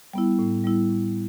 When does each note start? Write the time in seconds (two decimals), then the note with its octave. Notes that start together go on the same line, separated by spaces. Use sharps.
0.14 G3 B3 E4
0.39 A2
0.64 G3 B3 E4
0.90 A2